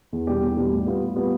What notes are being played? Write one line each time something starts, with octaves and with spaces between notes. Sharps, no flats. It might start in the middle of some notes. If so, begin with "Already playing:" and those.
E2
B2 G3 D4 G4
E2
B2 G3 D4 G4
A2
G3 B3 F4
A2
G3 B3 F4